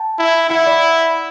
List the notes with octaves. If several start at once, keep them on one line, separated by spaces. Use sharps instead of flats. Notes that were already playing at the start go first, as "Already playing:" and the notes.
Already playing: G5 A5
E4
E4 F#5
D5